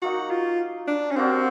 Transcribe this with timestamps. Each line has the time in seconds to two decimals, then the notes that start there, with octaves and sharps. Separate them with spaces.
0.02 F#3 A#3 D#4 F#4
0.31 F4
0.88 D4
1.11 C#4
1.16 G3 A#3 C4 D4 F#4